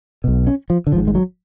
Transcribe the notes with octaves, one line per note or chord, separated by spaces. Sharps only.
B1 B2
C#4
F3
D3
G#1 G#2 F3
G#3
F#3